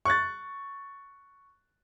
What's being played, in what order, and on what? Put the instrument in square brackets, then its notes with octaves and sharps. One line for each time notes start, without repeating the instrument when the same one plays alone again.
[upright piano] C#6 F#6 A6